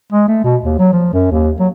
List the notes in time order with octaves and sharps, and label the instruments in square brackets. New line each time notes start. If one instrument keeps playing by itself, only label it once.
[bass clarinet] G#3
A3
B2
D#2
F#3
F3
F#2
D#2
F#3